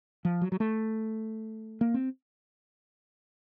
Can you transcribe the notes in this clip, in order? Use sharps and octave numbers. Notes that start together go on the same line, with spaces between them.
F3
F#3
F#3
A3
A#3
C4